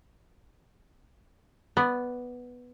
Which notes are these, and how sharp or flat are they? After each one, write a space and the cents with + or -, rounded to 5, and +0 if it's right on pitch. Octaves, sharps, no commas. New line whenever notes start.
B3 +0 D5 +0